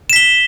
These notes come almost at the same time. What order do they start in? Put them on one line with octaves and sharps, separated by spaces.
E7 B6 G7